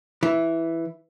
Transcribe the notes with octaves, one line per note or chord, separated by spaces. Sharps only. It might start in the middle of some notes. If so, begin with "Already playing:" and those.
E3